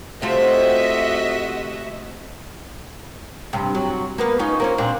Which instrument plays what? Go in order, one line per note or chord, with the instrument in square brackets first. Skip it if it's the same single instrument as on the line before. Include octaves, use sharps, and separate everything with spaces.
[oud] C3 A3 F4 [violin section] F#4 D#5 E5
[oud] G2 C3
F#3
A#3 B3 B4
C#4 D#4 F4
A#3 C4 C#4
A#2 C4 D4